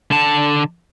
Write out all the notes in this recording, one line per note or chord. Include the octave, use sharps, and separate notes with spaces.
D3 A5